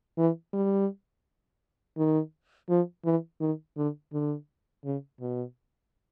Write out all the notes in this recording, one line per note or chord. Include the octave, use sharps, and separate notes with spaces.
E3
G3
D#3
F3
E3
D#3
D3
D3
C#3
B2